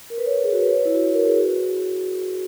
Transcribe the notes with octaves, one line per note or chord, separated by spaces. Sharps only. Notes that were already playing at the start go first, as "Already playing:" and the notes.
A#4
B4
C#5
B4
G#4
F#4
B4
C#5
B4
E4
F#4
A#4
G#4
F#4